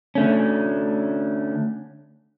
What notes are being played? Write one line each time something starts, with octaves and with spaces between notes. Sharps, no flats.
D3 A3 C#4